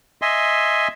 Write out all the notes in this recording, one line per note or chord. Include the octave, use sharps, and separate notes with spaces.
D#5 E5 G#5 C6